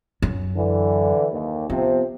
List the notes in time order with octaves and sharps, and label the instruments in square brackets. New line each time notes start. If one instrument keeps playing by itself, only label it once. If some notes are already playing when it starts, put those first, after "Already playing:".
[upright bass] F#2
[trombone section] D3 E3
D#2
[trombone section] C3 F3 C4 [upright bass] B3